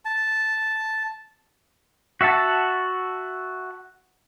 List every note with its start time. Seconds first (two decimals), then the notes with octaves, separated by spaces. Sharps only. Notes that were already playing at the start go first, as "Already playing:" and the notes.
0.05 A5
2.21 F#4 E5 F#5 A5